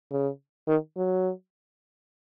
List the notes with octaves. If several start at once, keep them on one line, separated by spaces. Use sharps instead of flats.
C#3
D#3
F#3